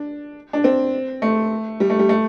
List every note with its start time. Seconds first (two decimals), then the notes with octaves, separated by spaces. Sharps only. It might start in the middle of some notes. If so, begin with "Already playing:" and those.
Already playing: D4
0.53 D4
0.64 C4
1.22 A3
1.80 G3
1.90 A3
1.99 G3
2.09 A3